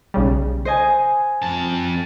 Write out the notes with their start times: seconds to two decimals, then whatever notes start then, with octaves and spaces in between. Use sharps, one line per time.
0.14 B1 C#3 G3
0.65 C5 D#5 G#5
1.43 F2 A5